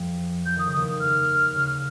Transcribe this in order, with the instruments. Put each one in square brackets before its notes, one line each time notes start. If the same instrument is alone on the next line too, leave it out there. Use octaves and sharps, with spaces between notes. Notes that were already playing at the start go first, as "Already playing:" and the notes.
Already playing: [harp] F2 F3
[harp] F3 [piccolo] G6
[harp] D#3 [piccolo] D#6
[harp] C#3
[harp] D#2 D#3 [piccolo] D#6
[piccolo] F6
[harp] C#3